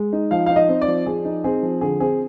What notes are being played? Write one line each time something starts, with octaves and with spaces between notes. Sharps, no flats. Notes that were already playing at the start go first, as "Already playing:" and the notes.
Already playing: G#3
D#4
F3 F5
D#4 F5
D#5
C4
D5
F3
F3 G#4
D#4
C4 G#4
F3
D3 G#4
C4 G#4